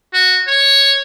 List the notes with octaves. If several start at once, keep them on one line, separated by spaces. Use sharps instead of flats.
F#4
C#5